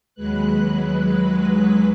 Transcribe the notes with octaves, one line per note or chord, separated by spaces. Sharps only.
D#2 F#3 G#3 B4 F#6